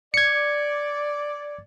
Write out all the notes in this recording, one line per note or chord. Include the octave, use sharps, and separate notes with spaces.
D5 G#6 C#7